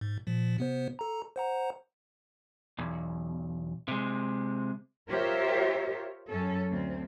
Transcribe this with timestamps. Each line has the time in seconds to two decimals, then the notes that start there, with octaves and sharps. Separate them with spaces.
0.01 G#2
0.27 A#2 F3
0.58 C3 B3 C5
0.99 A4 A#5
1.36 C5 F#5 A#5
2.79 B1 E2
3.88 C3 G#3
5.09 F4 G4 A#4 C5 C#5 E5
6.29 F#2 C#4 A4
6.72 D2 C4